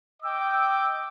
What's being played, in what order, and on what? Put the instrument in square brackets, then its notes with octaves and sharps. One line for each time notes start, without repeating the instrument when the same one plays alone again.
[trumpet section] D#5 G5 D6 [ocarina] E6